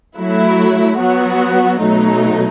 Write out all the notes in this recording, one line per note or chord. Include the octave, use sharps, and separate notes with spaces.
F#3 A3 E4
F#3 B3 F#4
B2 F#3 A3 D#4